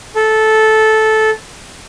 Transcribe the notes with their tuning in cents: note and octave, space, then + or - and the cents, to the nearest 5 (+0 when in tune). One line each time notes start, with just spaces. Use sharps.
A4 -10